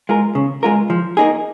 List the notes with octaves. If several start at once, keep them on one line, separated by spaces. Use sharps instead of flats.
G#3 F4 A#4
C#3
G#3 F4 A#4
F3
A#3 D#4 G#4